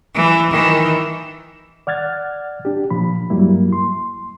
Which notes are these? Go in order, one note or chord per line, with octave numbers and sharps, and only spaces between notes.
E3
D#3 E3
D5 F#5 F6 G#6 A6
D4 G4
A#2 F3 B5
G2 F#3 G3 A#3 E4
C6